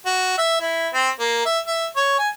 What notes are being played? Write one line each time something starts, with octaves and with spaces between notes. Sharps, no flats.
F#4
E5
E4
C4
A#3
E5
E5
C#5
G#5